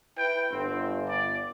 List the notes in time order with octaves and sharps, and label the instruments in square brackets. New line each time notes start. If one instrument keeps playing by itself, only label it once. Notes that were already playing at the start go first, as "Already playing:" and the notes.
[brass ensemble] E4 B4 [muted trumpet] G5
[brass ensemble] G1 [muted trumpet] C4
[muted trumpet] D5